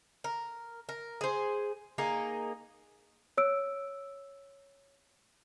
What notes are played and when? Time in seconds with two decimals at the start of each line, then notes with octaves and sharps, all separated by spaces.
0.24 A#4
0.89 A#4
1.21 G#4 C5
1.98 A#3 D#4 G#4
3.38 C#5 E6 D7